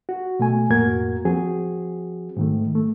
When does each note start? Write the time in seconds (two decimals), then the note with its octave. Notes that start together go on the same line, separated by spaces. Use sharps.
0.09 F#4
0.39 B2 A3 G#5
0.70 F2 A2 A#3 F#4 A#4 G#6
1.25 F3 C4 F#4 G#4
2.37 G#2 D#3 A3
2.75 A3